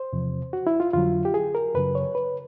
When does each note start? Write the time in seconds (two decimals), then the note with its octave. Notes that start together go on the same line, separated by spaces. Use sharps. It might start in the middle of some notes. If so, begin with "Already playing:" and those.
Already playing: C5
0.13 E2 C3 F3
0.53 F#4
0.67 E4
0.80 F4
0.93 F2 D3 F#3 F4
1.25 G4
1.34 G#4
1.55 A#4
1.74 F#2 C#3 F#3 B4
1.95 C#5
2.15 B4